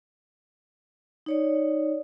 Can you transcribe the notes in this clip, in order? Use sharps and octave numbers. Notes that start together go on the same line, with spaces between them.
D#4 C#5 D5